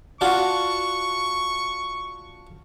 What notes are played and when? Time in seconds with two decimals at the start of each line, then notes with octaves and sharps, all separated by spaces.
0.21 D4 F4 F#4 C#6